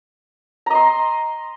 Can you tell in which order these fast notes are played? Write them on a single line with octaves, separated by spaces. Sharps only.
A#5 D#5 C6